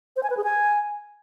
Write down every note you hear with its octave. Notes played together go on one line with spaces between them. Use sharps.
C5
G#5
B4
G#4
G#5